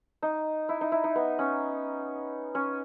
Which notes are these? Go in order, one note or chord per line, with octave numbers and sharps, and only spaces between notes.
D#4
E4
D#4
E4
D#4
B3
C#4
C#4